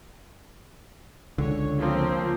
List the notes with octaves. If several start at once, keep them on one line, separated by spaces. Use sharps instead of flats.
C#2 D3 C#5
F3 A#3 C4